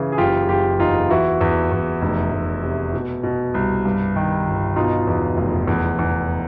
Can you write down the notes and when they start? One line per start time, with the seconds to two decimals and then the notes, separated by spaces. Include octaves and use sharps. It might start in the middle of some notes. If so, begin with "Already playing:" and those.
Already playing: C#3 E3
0.12 G#4
0.18 F#1 F4 G4
0.49 F#1 F4 G4
0.79 E2 D#4 F4
1.10 E3 E4 F#4
1.41 E2
1.72 E2
2.02 F1
2.32 F1
2.63 C3
2.93 B2
3.23 B2
3.54 C2
3.85 G2
4.16 D#3
4.46 G1
4.76 B2 D#4 F4
5.07 E2
5.37 F1
5.67 E2
5.99 E2